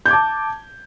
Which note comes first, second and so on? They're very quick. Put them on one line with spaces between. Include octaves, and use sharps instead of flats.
G6 G#6 D6 A5